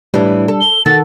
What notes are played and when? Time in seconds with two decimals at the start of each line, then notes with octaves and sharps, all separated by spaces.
0.14 A2 E3 G3 D4
0.48 A4
0.61 G7
0.86 D#3 F#4 A4 A6